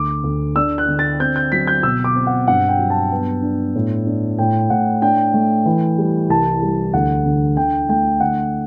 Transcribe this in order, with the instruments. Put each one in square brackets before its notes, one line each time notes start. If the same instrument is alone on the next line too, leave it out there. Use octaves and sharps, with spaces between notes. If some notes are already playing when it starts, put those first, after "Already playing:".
Already playing: [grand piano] D2 D6
D2
D4 E6
F#6
D3
A6
C4 G6
G6
F#3 B6
G6
B2 E6
D6
C4
F#5
G2 F#5
G5
F#3
A5
B3
D4
A2
D4
A2 G5
A2 F#5
D4 G5
A3
E3
G3
C2 A5
G3
D2 F#5
D3
D3 G5
A3 G5
D3 F#5